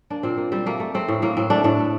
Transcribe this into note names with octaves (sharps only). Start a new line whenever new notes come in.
A#3 D4
A#2 C4
A#3
G3 C4
A3 A#3
A3
A3 C4
A2
A2 A#3
A2 C4
A3 D4
A2 D4
A3